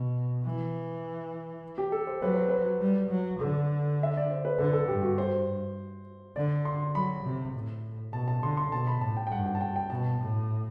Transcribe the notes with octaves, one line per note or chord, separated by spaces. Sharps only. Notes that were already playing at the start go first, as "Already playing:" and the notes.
Already playing: B2
E3
G4
A4
C5
F#3 B4
C5
B4
G3
F#3
D3 A4
E5
D5
C5
B4
D3 A4
A4
G2 G4
F#4
C5
D3 D5
C6
F#3 B5
C3
A2
B2 A5
A5
D3 C6
C6
B2 A5
B5
A2 A5
G5
G5
G2 F#5
G5
A5
G5
G5
B2 A5
A2